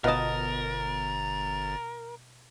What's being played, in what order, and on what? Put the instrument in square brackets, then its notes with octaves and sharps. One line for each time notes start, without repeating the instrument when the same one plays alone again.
[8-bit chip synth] G1 A6 [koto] B2 A5 [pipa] F4 D#5 [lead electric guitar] A#4